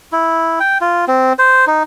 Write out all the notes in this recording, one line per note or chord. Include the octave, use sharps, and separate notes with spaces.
E4
G5
F4
C4
C5
D#4